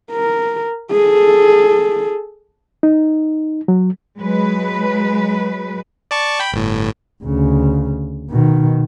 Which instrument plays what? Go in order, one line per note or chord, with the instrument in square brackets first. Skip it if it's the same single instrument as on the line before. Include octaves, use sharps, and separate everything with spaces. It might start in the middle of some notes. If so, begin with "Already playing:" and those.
[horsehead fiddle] A#4
G#4 A4
[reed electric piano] D#4
F#3
[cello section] F#3 G#3 B4
[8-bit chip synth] D5 A5 C#6
G5 B5
G1 A2
[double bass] D2 C#3
B2 D#3